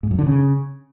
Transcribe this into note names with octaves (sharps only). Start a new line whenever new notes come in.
G#2
F#2
D3
C#3